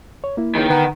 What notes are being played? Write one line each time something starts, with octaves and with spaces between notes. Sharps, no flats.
C#5
A#3 E4
C#2 D#3
D3 B3 F#5 A#5